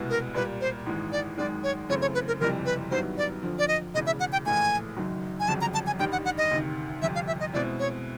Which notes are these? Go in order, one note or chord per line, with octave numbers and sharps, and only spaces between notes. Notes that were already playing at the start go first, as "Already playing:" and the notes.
Already playing: C2 B2 G#3 B3 E4
A#4
A#2 G3 A#3 B4
C5
G#1 G#2 E3 G#3
D5
G#1 F#2 D#3 G#3 D5
C#5
F#2 C#3 E3 A3 C4 C#5
C#5
B4
A#4
F#1 F2 C3 E3 G3 A#4
B4
G2 D#3 F#3 B3 E4 C5
D5
F2 D3 F3
D5
D#5
E1 E2 C#3 E3 D#5
E5
F#5
G5
A#1 A2 E3 A3 G#5
F#1 F#2 D#3 F#3
G#5
G1 F2 C#3 F#3 A5
A#5
A5
G#5
A1 G2 D#3 G3 G5
F#5
F#5
D#5
D2 C3 D#3
G1 F2 C3 E5
F5
E5
D#5
B2 G#3 C4 E4 D5
C#5